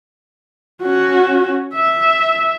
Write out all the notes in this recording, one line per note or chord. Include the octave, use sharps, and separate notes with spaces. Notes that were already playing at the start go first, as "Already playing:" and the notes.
C#4 F#4
E5